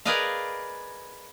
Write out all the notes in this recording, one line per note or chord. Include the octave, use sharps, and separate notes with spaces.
G#4 A#4 B4 D5 D#5 F5